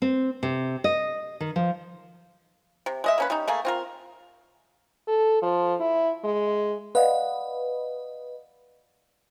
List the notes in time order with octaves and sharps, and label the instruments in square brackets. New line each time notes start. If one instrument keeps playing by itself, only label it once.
[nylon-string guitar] C4
C3
D#5
D#3
F3
[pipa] C3
G#3 D#5 E5
A#3 C#4 B4
G3 C#4 D#4
A3 A#3 G#4
C4 F4 A#4
[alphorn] A4
F3
E4
G#3
[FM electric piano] B4 D#5 [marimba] D5 F5 F#5